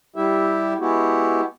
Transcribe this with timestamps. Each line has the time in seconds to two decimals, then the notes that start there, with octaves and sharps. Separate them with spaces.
0.16 G3 E4 G4 E5
0.80 G#3 B3 E4 F#4 G4